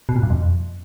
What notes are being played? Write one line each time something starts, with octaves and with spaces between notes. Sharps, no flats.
B2
A#2
G2
F2